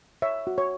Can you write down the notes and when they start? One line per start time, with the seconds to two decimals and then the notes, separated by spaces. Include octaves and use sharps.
0.22 C#5 E5
0.47 F#4
0.58 C#5